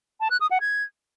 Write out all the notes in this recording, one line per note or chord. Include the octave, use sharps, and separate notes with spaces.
A5
F#6
D#6
F#5
G#6